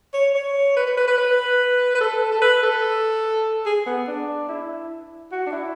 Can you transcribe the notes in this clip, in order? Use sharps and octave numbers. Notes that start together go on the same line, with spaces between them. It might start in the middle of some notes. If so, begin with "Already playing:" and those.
C#5
C#5
B4
B4
B4
B4
B4
B4
A4
A4
B4
A4
G#4
B3
D4
E4
F#4
D4
E4